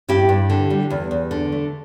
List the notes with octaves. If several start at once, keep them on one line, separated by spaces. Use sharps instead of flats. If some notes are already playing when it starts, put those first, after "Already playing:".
G2 E4 G4
G2
D3
G3
E2
E2
D3
A3